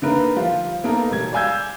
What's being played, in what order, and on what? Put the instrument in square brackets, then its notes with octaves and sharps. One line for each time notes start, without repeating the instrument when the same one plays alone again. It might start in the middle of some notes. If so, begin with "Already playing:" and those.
[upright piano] D3 A#3 D#4 A#4 B4
F3 G3 F4
A#3 B3 D#4 A4 A#4
E1 G3 G#6
D5 F5 G#5 E6 G6 G#6